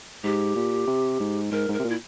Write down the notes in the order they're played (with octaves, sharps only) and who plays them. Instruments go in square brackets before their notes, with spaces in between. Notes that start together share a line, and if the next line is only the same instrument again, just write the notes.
[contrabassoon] G#2 [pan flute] G4
[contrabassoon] A#2
C3
G#2
[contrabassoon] G#2 [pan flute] A#4
[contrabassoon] G#2
[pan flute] A#4
[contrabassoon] C3
A#2
[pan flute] E4